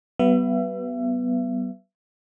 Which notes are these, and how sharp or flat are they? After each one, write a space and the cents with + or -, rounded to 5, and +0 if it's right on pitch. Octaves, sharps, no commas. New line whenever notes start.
G3 -45 B3 +0 E5 +35